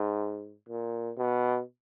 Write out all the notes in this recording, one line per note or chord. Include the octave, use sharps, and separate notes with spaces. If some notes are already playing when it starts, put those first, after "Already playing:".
Already playing: G#2
A#2
B2